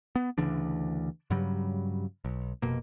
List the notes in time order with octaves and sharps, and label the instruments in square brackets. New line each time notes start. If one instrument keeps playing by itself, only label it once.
[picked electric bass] B3
D2 C#3 E3 D4
G2 C#3 F#3 G3
B1
F1 B2 A#3